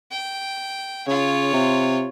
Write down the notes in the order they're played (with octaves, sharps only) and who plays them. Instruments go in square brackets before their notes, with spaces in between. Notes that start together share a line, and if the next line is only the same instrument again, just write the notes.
[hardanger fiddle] G5
[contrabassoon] C#3 [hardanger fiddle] F4 C#5
[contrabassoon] C3